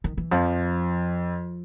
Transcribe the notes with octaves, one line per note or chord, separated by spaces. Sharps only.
D#3
E3
F2 F3